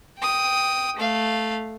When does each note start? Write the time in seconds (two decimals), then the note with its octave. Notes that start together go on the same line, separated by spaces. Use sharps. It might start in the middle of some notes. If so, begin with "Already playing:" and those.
0.20 G5 D#6
0.97 A3 F5